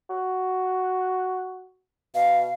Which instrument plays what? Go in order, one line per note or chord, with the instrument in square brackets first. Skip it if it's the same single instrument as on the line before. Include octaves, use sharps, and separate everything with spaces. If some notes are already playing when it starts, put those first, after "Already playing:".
[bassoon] F#4
[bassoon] B2 [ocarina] F5